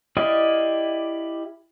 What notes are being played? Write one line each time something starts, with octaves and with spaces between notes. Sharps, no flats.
E4 G4 D5 D#5 F5